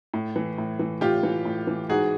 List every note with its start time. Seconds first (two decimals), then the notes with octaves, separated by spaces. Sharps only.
0.14 A2
0.36 E3
0.58 A2
0.79 E3
1.01 A2 F4 G4
1.23 E3
1.45 A2
1.67 E3
1.89 G#2 F#4 G#4